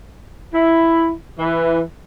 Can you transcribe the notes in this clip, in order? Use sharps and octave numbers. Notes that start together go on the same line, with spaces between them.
E4
E3